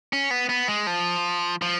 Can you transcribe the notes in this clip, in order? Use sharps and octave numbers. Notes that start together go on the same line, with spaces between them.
C#4
B3
B3
G#3
F3
F3